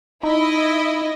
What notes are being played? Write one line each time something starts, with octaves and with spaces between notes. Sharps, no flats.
D#4 E4 D#5